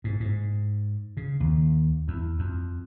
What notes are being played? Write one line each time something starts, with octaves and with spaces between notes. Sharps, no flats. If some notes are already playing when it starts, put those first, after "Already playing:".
G#2
G#2
C#3
D#2
E2
F2